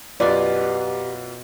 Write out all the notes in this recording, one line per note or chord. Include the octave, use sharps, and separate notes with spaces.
F#2 B2 F4 G4 B4 D5 G#5